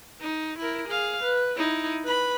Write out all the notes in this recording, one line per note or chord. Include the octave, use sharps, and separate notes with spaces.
D#4
E4 A#4
G#4 F5
B4
D#4 E4
B4 B5